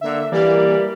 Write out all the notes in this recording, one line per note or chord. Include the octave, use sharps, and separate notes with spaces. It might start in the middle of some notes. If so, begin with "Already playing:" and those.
D3 A#3 E5
E3 G3 A#3 D5